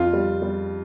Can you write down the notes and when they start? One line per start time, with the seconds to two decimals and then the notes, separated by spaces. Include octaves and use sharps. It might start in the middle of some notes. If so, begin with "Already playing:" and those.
Already playing: F2 F4
0.13 G3
0.42 G3